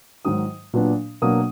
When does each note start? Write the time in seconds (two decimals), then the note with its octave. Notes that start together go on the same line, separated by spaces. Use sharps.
0.25 G#2 D#3 F#3 D#6
0.73 A#2 F#3 B3 D4
1.22 B2 F#3 A#3 D4 D#6